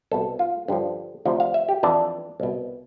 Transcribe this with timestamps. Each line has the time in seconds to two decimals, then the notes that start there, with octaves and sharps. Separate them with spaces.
0.11 C2 B2 A4
0.39 F4
0.68 G2 D3 F3
1.25 D2 C3 F3
1.40 F5
1.54 E5
1.69 G4
1.83 F2 E3 D4
2.40 C2 B2